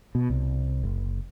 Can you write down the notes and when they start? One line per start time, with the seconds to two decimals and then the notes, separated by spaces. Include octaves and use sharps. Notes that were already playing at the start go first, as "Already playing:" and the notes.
0.15 B2
0.30 C2
0.83 F#1